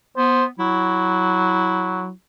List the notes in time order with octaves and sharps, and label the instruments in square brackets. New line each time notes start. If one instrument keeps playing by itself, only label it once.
[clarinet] B3 [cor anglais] C5
[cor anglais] F#3 [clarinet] E4